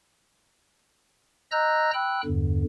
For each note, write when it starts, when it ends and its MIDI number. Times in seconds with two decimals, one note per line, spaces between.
1.52 1.91 75
1.52 1.91 82
1.52 1.91 88
1.52 1.91 90
1.52 1.91 91
1.52 1.91 94
1.94 2.21 79
1.94 2.21 83
1.94 2.21 88
1.94 2.21 90
2.25 2.63 40
2.25 2.63 43
2.25 2.63 50